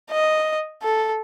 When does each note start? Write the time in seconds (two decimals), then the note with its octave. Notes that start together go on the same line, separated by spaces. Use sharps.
0.11 D#5
0.83 A4